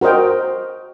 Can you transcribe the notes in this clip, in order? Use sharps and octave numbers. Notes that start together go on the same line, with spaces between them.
F#4 A#4 C5 D#5 G5